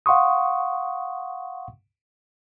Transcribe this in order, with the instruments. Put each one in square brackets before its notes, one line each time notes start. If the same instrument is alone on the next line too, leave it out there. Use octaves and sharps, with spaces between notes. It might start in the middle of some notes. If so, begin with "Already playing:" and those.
[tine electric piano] F5 F#5 C6 C#6 D#6